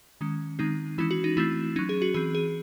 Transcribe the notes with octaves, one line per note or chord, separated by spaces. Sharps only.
D#3 G#3 C#4
D#3 G#3 C4 D#4
E3 G#3 C#4 E4
F#4
D#4
E3 A3 C4 E4
F#3 C#4 D#4
G#4
F#4
E3 C4 G#4
G#4